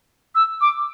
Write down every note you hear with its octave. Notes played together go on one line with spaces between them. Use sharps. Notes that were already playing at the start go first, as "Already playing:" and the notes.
E6
D6